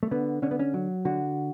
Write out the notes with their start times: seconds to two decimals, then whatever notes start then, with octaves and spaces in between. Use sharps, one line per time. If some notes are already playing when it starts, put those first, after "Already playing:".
0.03 A3
0.11 D3 B3
0.42 D3 C#4
0.51 B3
0.59 C#4
0.74 F#3
1.05 D3 F#4